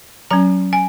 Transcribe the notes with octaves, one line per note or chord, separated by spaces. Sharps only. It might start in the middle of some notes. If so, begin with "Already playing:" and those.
F#3 C#4 A#5
G#5